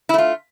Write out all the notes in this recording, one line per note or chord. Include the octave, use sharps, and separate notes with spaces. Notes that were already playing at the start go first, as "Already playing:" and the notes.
A3 E4 F4